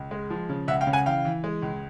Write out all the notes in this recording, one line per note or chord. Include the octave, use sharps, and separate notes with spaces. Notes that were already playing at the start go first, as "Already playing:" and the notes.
Already playing: C#2
G#3
F3
C#3
C#2 E5 F#5
F5 G5
C#3
F#5 G#5
E3 F5 G5
E3
G#3
C#2